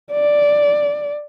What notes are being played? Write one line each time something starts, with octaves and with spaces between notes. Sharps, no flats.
D5